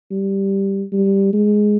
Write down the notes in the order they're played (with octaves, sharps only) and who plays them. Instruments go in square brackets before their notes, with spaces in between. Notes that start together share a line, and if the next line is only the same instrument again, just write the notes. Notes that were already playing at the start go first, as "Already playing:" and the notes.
[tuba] G3
G3
G#3